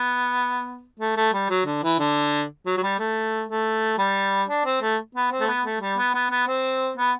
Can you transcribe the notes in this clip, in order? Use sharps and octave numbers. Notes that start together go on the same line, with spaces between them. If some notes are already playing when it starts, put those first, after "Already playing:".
Already playing: B3
A3
A3
G3
F#3
D3
E3
D3
F#3
F#3
G3
A3
A3
G3
D4
C4
A3
B3
C4
A3
B3
A3
G3
B3
B3
B3
C4
B3